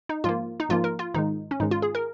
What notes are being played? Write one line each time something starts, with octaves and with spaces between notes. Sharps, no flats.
D#4
G#2 F3 A#3 F4
D#4
G#2 F3 A#3 F4
A#4
F4
G#2 D#3 G#3 D#4
C#4
G#2 D#3 G#3 D#4
F4
G#4
A#4